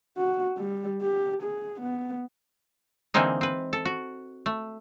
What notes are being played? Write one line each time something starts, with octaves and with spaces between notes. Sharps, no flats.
F#4
G3
G4
G#4
B3
D3 E3 G#3 A#3 C4 D#4
C4 B4
A4
F#4
A3